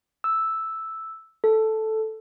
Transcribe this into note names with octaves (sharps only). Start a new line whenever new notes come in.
E6
A4